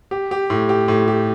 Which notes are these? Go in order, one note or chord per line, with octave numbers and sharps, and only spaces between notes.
G4
G4
A2
G4
A2
G4